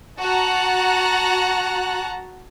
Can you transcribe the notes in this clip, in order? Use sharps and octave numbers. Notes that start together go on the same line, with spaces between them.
F#4 A5 A#5 F#6